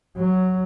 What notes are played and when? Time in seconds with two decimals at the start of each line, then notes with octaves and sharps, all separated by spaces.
0.17 F#3